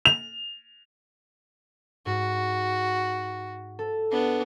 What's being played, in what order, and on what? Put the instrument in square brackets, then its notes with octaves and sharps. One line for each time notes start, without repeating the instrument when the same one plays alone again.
[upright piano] F7
[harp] G#2 [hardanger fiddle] F#4
[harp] A4
[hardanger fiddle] B3 D4